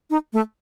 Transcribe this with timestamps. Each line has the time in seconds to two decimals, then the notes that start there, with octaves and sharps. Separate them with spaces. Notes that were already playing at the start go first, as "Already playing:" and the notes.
0.10 D#4
0.33 A3